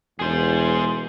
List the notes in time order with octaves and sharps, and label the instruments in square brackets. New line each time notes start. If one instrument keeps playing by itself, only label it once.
[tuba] E1 [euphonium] E2 [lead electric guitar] G#4 C5